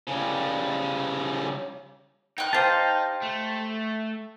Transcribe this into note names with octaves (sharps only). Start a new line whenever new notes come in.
C#3 G3
D#4 G5 F#6
G4 C5 F5 G5 A5
A3